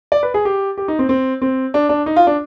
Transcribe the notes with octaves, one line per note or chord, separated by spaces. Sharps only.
D5
B4
G#4
G4
G4
D#4
C4
C4
C4
D4
D4
D#4
F4
D4